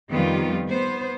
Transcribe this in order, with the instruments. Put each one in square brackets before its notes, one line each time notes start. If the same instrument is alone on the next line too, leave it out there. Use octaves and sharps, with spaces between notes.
[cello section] F2 D#3 G3 B3 F4 G4
B3 C5